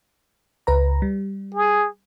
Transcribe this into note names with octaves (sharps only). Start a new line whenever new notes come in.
C#2 B4 A#5
G3
G#4